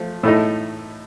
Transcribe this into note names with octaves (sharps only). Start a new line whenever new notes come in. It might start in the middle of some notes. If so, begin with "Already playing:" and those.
Already playing: F3 A3
A2 A3 D#4